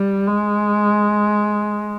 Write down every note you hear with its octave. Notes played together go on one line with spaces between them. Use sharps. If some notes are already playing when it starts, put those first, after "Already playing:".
Already playing: G3
G#3